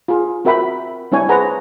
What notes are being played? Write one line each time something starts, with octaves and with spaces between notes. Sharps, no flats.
F4 G#4
C4 F#4 A#4 E5 G5 B5
G3 C4 D4 E4 C#5 G#5
G#4 B4 C5 F#5 A#5